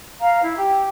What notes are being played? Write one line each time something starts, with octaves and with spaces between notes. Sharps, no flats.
F5 A#5
E4
G4